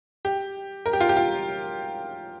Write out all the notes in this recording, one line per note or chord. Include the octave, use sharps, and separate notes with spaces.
G4
A#4
G4
F4
G4
F4